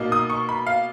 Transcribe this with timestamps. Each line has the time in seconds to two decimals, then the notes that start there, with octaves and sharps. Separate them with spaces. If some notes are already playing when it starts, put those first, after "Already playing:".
Already playing: B2 A#3 D#4
0.12 D#6
0.30 C#6
0.49 B5
0.67 F5